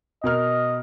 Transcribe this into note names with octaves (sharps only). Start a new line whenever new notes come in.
B2 A#4 D#5 F6